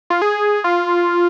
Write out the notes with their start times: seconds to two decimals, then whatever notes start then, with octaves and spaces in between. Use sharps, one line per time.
0.10 F4
0.22 G#4
0.64 F4